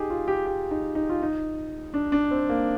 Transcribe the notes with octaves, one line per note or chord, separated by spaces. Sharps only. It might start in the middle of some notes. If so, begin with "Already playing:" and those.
Already playing: D#4 G4 G#4
F4
G4
G4
D#4
D#4
F4
D#4
D4
D4
C4
A#3